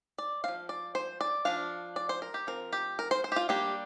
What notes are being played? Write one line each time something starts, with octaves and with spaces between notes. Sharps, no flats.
D5
F3 C4 F5
D5
C5
D5
F3 D4 F5
D5
C5
A#4
G4
F3 C4 A#4
G4
A#4
C5
C5
G4
F4
G3 A#3 D4 G4